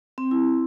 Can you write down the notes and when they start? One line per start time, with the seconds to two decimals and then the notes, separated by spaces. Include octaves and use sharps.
0.18 C4
0.31 E4